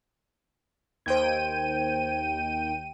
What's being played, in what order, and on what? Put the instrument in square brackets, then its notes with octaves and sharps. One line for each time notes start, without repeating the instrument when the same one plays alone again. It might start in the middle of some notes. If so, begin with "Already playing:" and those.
[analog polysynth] D#2 G5 D#7 [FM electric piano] C5 G#6